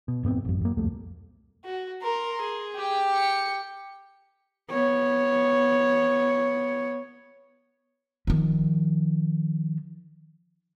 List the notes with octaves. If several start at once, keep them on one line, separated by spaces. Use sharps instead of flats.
B2
F1 G#2 B3 C4
A1 F#2
F#2 A#3
D#1 C2 F2 A3
F#4
A#4 C6
G#4
G4 G5
C#7
B3 C#5
D#3 F3